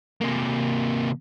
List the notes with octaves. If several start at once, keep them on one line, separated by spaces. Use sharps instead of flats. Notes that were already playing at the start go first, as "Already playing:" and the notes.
C3 A#3